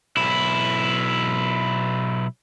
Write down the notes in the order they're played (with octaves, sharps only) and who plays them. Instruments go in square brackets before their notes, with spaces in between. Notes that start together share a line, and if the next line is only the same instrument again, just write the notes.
[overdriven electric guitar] B1 E4